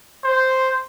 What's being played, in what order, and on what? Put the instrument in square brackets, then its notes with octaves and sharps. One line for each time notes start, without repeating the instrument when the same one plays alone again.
[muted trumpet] C5